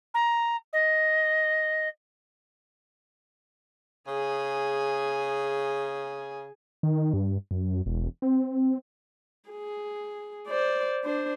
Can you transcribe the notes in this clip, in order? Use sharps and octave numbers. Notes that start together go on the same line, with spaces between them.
A#5
D#5
C#3 G#4 G#5
D#3
G2
F#2
E1
C4
G#4
C5 D5
D4 C5